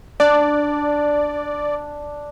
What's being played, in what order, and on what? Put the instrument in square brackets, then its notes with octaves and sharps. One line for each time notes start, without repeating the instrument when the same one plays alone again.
[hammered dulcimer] D4 [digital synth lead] D5